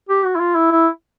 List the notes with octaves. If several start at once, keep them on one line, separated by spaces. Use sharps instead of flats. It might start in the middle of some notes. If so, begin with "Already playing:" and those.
G4
F#4
E4
F4
E4
E4